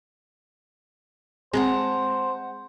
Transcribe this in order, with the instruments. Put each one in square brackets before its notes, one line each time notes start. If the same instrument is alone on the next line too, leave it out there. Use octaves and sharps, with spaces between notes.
[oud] G#3 [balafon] C4 [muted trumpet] C5 [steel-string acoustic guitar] F#5 A5 A#5